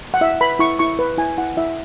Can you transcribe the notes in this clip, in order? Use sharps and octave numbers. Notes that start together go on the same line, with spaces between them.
F#5
E4 E5
B4 B5
E4 C#6
E4 C#6
B4
E4 G#5
E4 F#5
E4 E5